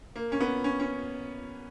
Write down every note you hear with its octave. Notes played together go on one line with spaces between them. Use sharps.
A#3
C#4
B3
C#4
C#4